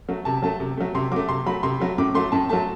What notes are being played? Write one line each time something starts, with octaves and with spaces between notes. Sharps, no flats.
F#3 A3
C3 A5
F#3 A3 A5
C3
F#3 A3
C3 C6
F#3 A3 D6
C3 C6
F#3 A3 B5
C3 C6
F#3 A3
A2 D6
F#3 A3 C6
A2 A5
F#3 A3 A5